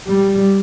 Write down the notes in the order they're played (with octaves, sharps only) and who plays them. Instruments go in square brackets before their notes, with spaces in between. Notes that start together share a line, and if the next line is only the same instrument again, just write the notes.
[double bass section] G3